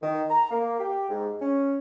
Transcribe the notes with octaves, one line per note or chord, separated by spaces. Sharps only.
D#3
A#5
A#3
G4
G#2
C#4